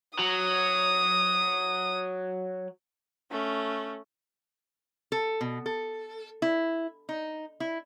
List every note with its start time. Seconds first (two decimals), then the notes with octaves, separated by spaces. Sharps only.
0.19 F#3 D#6
3.31 A3 C#4
5.12 A4
5.41 B2
5.66 A4
6.42 E4
7.09 D#4
7.60 E4